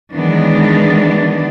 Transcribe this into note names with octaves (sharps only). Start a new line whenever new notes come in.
D#3 E3 F#3 G#3 B3 D4